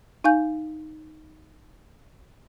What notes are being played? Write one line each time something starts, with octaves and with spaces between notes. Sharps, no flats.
D#4 F5 G#5 G6